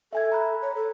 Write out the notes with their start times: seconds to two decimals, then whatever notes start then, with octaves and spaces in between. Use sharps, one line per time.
0.13 A4 E5 G#5 G#6
0.32 A#5 B5 F#6
0.62 C#5
0.75 A4